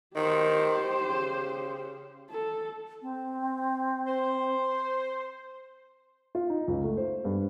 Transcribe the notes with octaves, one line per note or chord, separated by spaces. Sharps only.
D#3 G4 C5
C#3
A4
C4
C5
F4
D#4
C#2
A3
C5
G2